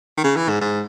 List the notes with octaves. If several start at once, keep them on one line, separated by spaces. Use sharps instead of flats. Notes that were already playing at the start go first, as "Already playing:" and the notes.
D#3
C#3
E3
G#2
G#2